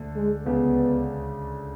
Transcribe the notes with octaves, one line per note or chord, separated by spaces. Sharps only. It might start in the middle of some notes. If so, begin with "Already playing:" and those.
Already playing: D2 D3
G#3
C#2 C#3 B3